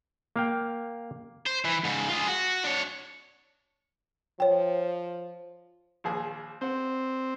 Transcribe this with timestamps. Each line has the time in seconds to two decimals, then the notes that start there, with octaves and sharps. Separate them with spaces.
0.36 A#3 F5 G5
1.46 C5
1.65 E3
1.84 G#2 C#3
2.09 F4 G#4
2.28 F#4
2.64 D4 C#5
4.40 F3 C#5 G5
6.04 A#1 D#2 G#4
6.61 C4 C5 F#5